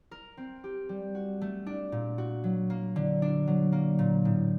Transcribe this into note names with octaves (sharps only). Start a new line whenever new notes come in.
A#4
C4
G4
G3
F#4
A3
D4
A#2
F#4
F#3
A#3
D3
D4
F#3
A#3
A#2
A2